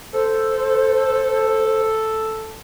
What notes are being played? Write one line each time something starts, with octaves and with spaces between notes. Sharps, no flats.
A4 C5